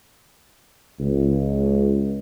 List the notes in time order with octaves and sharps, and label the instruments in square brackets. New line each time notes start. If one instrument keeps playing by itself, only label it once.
[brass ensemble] C#2